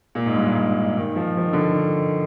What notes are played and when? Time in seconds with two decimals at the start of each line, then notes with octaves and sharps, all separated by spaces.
0.15 A#2
0.26 G#2
0.36 G2
0.46 G#2
0.56 G#2
0.97 D#3
1.16 F3
1.37 F3
1.46 D#3
1.53 D3
1.61 D#3